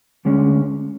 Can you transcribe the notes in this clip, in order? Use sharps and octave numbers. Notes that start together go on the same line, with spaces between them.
D2 D3 G#3 C#4